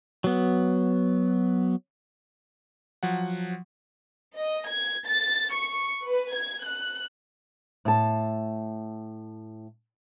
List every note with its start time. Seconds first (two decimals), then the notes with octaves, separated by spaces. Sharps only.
0.24 F#3 B3
3.03 F3 F#3 F#5
4.38 D#5
4.69 G#6
5.08 A6
5.56 C#6
6.05 B4
6.34 G#6
6.63 F#6
7.85 A2 A5